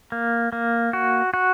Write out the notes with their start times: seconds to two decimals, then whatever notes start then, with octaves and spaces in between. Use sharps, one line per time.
0.12 A#3
0.52 A#3
0.93 F#4
1.34 F#4